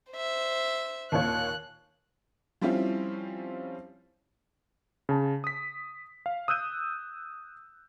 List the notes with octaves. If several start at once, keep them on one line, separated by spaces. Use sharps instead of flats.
C5 E5
D#2 A#2 C#5 F#6
F3 G3 C4 C#4 E4 F4
C#3 A5
D#6 B6
F5
D#6 E6 F#6 G6 D#7